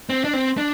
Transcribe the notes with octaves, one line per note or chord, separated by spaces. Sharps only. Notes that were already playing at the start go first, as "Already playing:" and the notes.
C4
D4
C4
D4